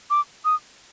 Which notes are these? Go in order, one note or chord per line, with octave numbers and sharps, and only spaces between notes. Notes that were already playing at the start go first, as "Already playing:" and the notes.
D6
D#6